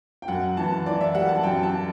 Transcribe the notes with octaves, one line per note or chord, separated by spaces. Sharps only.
G5
F#2 F#5
E3 A5
E3 D5
E5
G3 F#5
A5
F#2 G5
A5